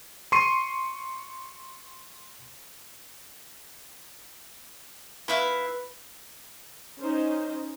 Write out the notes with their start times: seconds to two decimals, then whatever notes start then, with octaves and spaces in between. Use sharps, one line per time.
0.32 C6 C#6 C7 D#7
5.28 E4 B4 E5 F5
7.01 C#4 D#4 C5 D#5